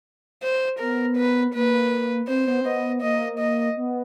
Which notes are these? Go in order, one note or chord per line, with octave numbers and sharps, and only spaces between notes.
C5
B3 A#4
B4
A#3 B4
C4 C5
B3
C4
B3 D#5
A#3 D#5
D#5
B3